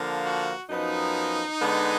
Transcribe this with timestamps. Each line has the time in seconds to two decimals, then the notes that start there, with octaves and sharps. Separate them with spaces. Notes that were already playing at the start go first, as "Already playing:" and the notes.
Already playing: D3 F3 A#3
0.24 F#4
0.70 F#2 F3 B3 D#4
1.60 D3 G#3 B3